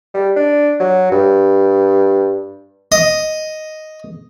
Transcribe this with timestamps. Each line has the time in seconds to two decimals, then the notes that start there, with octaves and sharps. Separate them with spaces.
0.14 G3
0.37 D4
0.80 F#3
1.12 G2
2.92 D#5